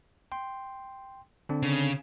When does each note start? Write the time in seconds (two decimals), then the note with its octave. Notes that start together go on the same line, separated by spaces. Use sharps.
0.32 G5 C6
1.49 D3 C4 D4
1.63 C#3